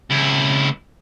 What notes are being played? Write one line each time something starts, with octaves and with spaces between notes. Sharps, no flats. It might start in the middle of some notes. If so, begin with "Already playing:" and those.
C#2 E4